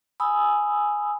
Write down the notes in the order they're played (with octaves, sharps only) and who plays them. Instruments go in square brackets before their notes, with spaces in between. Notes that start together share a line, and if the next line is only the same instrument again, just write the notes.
[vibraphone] G#5 B5 D#6 E6